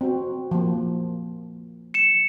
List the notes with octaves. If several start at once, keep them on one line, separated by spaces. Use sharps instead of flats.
C4 F#4
F3 A#3
C#7 E7